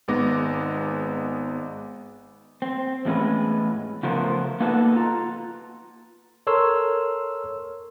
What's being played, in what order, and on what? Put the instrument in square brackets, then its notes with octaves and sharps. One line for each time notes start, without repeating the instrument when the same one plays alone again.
[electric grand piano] G#1 G#3 B3 D#4 D6 A#6
[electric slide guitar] C4
E2 A2 G#3 C#4 B4
C#3 F3 A3 B3 A#4 C5
A#3 B3 D#4 F#4 A4 B4
F4 A#5
[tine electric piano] A4 A#4 C#5 C6 E6 F6